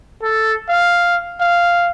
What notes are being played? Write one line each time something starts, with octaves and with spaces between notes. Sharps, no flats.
A4
F5
F5